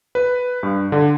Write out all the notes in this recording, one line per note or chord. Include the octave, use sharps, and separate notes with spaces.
B4
G2
D3